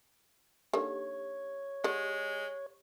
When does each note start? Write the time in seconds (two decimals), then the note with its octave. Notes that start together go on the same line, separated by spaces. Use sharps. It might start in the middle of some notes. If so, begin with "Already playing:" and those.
0.74 D3 D#3 A#3 G4 C#5
1.84 G#3 G4 D5 F#5